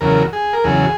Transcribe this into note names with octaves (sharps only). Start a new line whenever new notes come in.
E2 C#3 F#3 A#4
G#4
A#4
E2 C#3 F#3 G#4